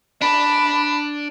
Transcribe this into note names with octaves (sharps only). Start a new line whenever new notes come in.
D4 B5